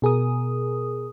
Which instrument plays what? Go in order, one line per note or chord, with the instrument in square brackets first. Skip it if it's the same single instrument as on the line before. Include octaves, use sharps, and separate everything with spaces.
[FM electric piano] B2 G#4 A#4 D#6